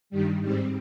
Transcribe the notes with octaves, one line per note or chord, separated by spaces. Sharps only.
G2 D#3 G3
G#2 G3 C4